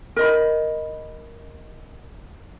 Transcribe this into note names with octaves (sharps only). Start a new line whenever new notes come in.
A#4 D#5 B5